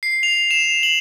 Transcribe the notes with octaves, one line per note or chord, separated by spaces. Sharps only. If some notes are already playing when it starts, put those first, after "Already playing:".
C7
F7
E7
F7
F#7